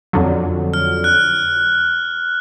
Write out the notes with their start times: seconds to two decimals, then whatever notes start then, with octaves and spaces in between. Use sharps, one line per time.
0.13 F2 D3 F#3
0.74 F6
1.04 F#6